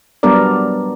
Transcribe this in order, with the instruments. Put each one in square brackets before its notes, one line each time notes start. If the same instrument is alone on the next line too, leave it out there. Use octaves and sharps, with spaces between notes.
[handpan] F#3 G3 B3 D4 A#4 D5